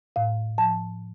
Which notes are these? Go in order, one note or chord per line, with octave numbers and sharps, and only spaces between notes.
A2 F5
F3 A5